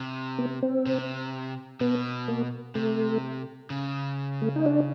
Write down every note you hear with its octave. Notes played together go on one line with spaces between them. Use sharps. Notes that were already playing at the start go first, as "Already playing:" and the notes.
Already playing: C3
B3
C4
C3
B2 B3
A#3
C3 A3
C#3
A3
D#4
D4